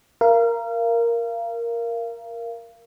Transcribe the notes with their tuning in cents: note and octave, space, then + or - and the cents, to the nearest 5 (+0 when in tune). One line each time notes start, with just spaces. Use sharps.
A#4 +0 F5 -30